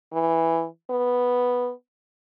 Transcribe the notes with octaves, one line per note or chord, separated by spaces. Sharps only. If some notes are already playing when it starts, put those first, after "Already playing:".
E3
B3